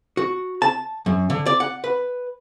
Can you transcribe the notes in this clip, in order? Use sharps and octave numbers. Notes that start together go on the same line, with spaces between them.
F#4
A5
F#2
D3
D5
F#5
B4